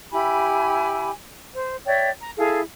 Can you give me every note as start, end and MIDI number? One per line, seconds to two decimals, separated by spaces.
0.12 1.11 64
0.12 1.11 67
0.12 1.11 80
0.12 1.11 83
1.53 1.78 72
1.86 2.10 73
1.86 2.10 74
1.86 2.10 76
1.86 2.10 79
2.20 2.31 82
2.38 2.61 64
2.38 2.61 68
2.38 2.61 69
2.38 2.61 77